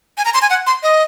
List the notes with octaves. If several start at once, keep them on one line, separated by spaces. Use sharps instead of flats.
G#5
A#5
C6
G#5
F#5
C6
D#5